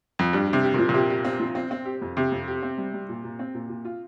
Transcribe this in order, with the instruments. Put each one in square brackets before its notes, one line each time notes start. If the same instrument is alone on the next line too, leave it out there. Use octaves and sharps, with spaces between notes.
[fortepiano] F2
[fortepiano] G2 [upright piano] G4
[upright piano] G4
[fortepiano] C3
[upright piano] G4
[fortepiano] A#2 [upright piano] F3
[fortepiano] A#2
[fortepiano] C3 [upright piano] G4
[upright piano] G4
C4
F3
C4
C4
G4
F2
[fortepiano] C3 [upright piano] G4
[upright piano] F2
G4
C4
G3
G3
A#2
A#2
C4
A#2
A#2
F4